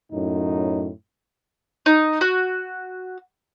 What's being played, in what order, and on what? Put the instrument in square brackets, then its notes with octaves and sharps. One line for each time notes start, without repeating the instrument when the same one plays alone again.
[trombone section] F#2 A2 D#4
[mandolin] D#4
F#4